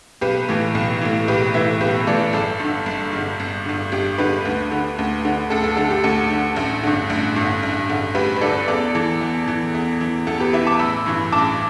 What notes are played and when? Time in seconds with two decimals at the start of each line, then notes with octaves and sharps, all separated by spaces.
0.21 B1 G4 B4
0.49 A2 E3
0.75 B1
1.01 A2 E3
1.28 B1 G4 B4
1.54 A2 E3 B4 E5
1.80 B1 G4 B4
2.07 A2 E3 A4 D5
2.33 G1 A4
2.60 G2 D3
2.86 G1
3.13 G2 D3
3.40 G1
3.66 G2 D3
3.92 G1 G4
4.18 G2 D3 G4 B4
4.45 D2
4.71 D3
4.99 D2
5.25 D3
5.50 D2 A4
5.64 A4
5.77 D3 A4
5.90 G4
6.04 D2 A4
6.30 D3
6.56 A1
6.83 G2 D3
7.10 A1
7.36 G2 D3
7.63 A1
7.89 G2 D3
8.15 A1 G4 B4
8.37 B4
8.41 G2 D3 A4 D5
8.68 E2 A4 D5
8.95 E3 A4
9.21 E2
9.48 E3
9.75 E2
10.01 E3
10.27 E2 A4
10.40 G4 B4
10.53 E3 B4 E5
10.66 A5 D6
10.79 A1 B5 E6
11.06 G2 E3
11.32 A1 A5 D6